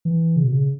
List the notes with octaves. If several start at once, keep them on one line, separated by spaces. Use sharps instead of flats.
E3
C#3
B2
C#3